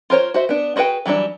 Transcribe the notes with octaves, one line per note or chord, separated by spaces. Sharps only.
F4 A#4 C5 C#5
F#4 C5 E5
B3 D4
D4 F#4 G#4 B4 G5
E3 F#3 G3 D4